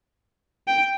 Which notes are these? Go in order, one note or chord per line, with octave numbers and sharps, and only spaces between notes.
G5